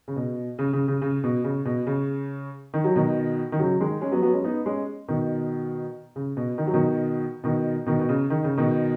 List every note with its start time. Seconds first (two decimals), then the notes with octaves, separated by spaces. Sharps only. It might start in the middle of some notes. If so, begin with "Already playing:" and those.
0.08 C#3
0.16 B2
0.59 C#3
0.73 C#3
0.88 C#3
1.02 C#3
1.24 B2
1.44 C#3
1.65 B2
1.87 C#3
2.74 D#3
2.84 F#3
2.95 B2 D#3
3.52 D#3
3.59 C#3 F#3
3.80 D#3 G#3
4.01 G#3 C#4
4.12 F#3 B3
4.22 F#3 B3
4.33 G#3 C#4
4.44 B3 D#4
4.66 G#3 C#4
5.08 B2 D#3
6.16 C#3
6.37 B2
6.58 D#3
6.67 F#3
6.74 B2 D#3
7.44 B2 D#3
7.86 B2 D#3
7.99 B2
8.09 C#3
8.30 D#3
8.44 C#3
8.57 B2 D#3